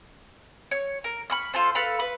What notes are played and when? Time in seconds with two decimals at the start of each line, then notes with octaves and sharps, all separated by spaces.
0.71 C#5
1.04 A#4
1.30 B5 C#6 F6
1.54 F4 A4 C5
1.75 A4 B4 F5 B5
2.00 B4